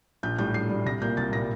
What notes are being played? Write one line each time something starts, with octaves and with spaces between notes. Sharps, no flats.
A#1 G6
A2 G3 G6
A#1 C7
A2 G3
C2 A#6
A#2 G3 A#3 G6
C2 A6
A#2 G3 A#3 A#6